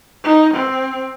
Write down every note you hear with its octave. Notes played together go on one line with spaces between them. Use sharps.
D#4
C4